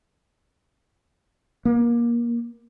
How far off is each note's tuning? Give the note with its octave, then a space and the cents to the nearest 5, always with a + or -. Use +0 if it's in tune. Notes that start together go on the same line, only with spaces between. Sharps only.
A#3 +25